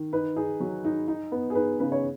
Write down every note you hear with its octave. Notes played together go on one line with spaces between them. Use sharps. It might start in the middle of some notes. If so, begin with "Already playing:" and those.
Already playing: D#3
D#4 B4
D#4 G#4
F#3
D#4
D#4
B3
G#4
D#4 B4
C#3 B4
C#5